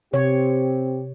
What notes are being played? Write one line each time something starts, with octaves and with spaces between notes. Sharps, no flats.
C3 C4 G4 C#5